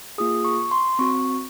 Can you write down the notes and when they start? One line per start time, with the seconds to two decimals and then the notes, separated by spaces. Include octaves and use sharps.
0.18 A#3 F4 G#4 D#6
0.45 C#6
0.71 C6
0.99 C4 F#4 C#6